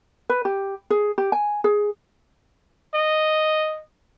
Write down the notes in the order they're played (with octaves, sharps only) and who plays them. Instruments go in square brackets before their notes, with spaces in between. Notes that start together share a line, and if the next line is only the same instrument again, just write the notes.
[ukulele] B4
G4
G#4
G4
G#5
G#4
[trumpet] D#5